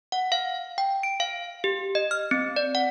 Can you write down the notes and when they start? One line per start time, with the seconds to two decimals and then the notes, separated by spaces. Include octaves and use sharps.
0.12 F#5
0.32 F5
0.78 G5
1.03 D7
1.20 F5
1.64 G4
1.95 D#5
2.11 F6
2.31 C4
2.56 D5
2.75 F#5